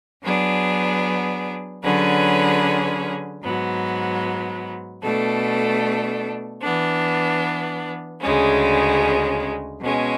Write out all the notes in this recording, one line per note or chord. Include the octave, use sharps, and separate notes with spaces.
F#3 B3 D4 G#4
D3 F#3 C#4 G#4 B4
G#2 F#3 B3
B2 A3 D4 A4
E3 B3 D4
D2 C#3 G#3 C#4
B2 G#3 C#4